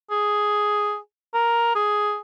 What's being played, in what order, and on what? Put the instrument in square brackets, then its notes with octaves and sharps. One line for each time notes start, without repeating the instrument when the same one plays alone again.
[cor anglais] G#4
A#4
G#4